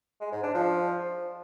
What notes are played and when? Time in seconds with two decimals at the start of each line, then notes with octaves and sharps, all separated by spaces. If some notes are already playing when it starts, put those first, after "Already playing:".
0.20 G#3
0.32 G#2
0.43 D4
0.54 F3